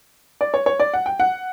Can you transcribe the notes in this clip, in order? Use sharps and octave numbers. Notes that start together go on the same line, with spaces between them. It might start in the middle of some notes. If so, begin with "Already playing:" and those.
D5
C#5
C#5
D5
F#5
G5
F#5